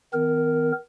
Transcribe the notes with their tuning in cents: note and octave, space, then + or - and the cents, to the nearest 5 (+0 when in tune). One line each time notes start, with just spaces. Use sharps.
D#3 +40 B3 +45 A#4 +0